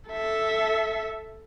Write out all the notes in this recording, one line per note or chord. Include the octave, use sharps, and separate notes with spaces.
A4 E5